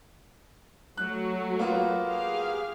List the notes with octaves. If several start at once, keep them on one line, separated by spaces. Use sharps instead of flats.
F#3 A3 F#4 F#6
A#3 B3 F4
G4 G#4 F5